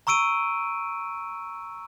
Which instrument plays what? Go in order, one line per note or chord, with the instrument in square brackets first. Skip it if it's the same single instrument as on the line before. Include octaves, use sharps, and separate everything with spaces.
[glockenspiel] A#5 C#6 E6 D7 D#7